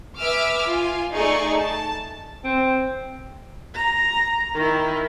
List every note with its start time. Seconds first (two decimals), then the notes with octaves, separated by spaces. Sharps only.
0.18 B4 E5 G#5 D6 E6 F6
0.66 F4 G#5
1.13 A3 D#4 G#4 D5 C#6 C#7
1.58 A5
2.44 C4
3.75 A#5
4.55 D#3 E4